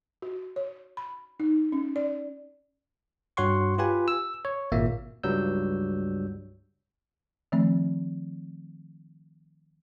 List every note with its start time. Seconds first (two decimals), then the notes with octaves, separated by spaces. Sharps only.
0.22 F#4
0.56 C#5
0.97 B5
1.40 D#4
1.72 C#4
1.96 D5
3.37 G2 F#4 C#5 F#5 C6 C#6
3.78 F4 G4 B4 G#5
4.08 E6
4.45 C#5
4.72 G#1 A#2 A#3 E5
5.23 C#2 G2 F#3 G3 E6 G6
7.52 D#3 F3 A3 C4